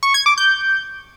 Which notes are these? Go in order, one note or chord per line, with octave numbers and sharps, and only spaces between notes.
C#6
G#6
D6
G6